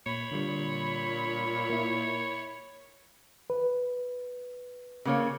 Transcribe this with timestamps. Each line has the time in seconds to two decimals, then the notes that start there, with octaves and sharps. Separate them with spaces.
0.06 A#2 C#5 B5
0.31 A#2 D3 G3
1.70 A#3 E4
3.50 B4
5.05 C#3 A#3 C#5